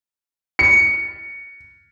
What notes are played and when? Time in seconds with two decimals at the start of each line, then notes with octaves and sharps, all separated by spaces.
0.59 C#7